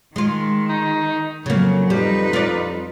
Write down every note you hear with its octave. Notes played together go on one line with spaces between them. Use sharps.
D#3 G#3 F4
D#4
F2 C#3 F#3 A#3
G3 D#4 B4
F4 D5